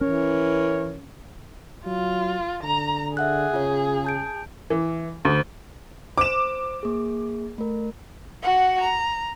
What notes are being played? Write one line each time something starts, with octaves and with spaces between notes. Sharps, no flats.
E3 C#4 A#4 C#5
F#3 F4
D3 A#5
G#4 E5 F#5 F#6
C#3 F4 C#5
A5 G6 D7
E3
D2
C5 D6 E7
A#3 G#4
A3 A#4
F#4 F#5
A#5